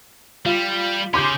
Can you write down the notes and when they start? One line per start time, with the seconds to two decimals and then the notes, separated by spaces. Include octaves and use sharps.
0.46 G3 F4
1.14 C#3 C#4 C6 D6 G6